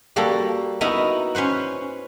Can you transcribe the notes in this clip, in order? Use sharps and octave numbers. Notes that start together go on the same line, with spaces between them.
G3 A#3 F#4 A4
B3 D#4 E4 F#4 A#4
C#4 B4 C5 F#5